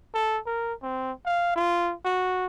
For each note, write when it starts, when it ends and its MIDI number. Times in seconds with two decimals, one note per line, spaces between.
0.14 0.39 69
0.46 0.73 70
0.83 1.12 60
1.25 1.53 77
1.56 1.93 65
2.05 2.46 66